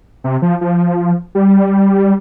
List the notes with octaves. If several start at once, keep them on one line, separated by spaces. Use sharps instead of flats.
C3
F3
F3
G3